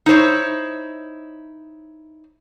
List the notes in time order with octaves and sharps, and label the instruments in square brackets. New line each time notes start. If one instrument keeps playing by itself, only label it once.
[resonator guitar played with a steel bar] D#4 E4 C5 C#5